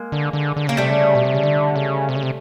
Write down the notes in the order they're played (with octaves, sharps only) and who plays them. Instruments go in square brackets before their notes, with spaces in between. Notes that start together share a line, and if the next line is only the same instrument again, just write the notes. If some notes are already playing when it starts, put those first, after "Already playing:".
Already playing: [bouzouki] G#3 A#3
[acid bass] D3
D3
D3
[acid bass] C#3 [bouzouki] A#3
[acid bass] C3 [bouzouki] G3 A3
[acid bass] C#3
B2
C3
C#3
D3
C#3
C3
C#3
C3